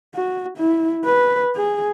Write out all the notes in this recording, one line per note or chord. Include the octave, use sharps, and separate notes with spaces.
F#4
E4
B4
G#4